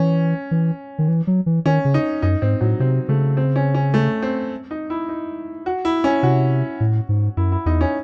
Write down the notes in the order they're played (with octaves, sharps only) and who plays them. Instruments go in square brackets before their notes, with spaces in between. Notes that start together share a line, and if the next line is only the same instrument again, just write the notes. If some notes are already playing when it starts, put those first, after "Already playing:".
Already playing: [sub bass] E3 [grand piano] C#4
[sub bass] E3
D#3
E3
F#3
E3
[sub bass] D#3 [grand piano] C#4
[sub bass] C#3
[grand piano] D#4
[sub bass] F#2 [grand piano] D#4
[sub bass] G#2 [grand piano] C4
[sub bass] A2 [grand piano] F#3
[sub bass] C3 [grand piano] C4
[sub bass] C#3 [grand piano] A3
[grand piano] C4
C#4
C#4
A3
C4
D#4
E4
D#4
F#4
E4
C#4
[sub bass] C3 [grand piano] F#4
[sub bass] A2
G#2
[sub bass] F#2 [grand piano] E4
[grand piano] E4
[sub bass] E2 [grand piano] D#4
[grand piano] C#4